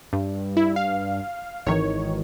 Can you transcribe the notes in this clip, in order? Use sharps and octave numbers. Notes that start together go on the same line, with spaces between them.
G2
E4
F5
G#1 D#3 E3 C#5